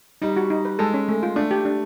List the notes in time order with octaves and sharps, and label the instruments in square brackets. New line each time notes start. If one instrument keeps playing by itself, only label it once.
[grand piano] G3 [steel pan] D#4
[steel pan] F#4
D#4
B4
[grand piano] G#3 [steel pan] A4
[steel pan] C#4
A3
F4
[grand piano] A3 [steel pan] D4
[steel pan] G4
D4